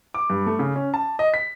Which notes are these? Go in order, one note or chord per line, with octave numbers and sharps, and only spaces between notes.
D6
G2
A3
C#3
C#4
A5
D#5
B6